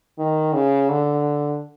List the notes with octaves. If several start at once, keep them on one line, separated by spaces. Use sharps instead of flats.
D#3
C#3
D3